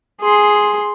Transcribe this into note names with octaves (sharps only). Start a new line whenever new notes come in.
G#4 C6